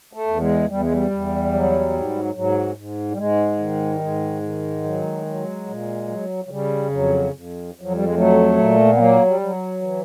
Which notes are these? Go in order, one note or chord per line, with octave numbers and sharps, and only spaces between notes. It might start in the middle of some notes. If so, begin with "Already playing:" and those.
A3
E2
G#3
E2 G3
G#3
G3
E2
F#3
G#2
G#2 F#3
G#2
G3
G#2 G#3
D#3
G3
G#2 G#3
D#3
F#3
F#3
A#2
F#3
F#3
C#3 G3
F2 F#3
F2
F2
F#3
G3
G#3
F#3 A3
A#2
B3
F#3 A#3
G3
F#3
E3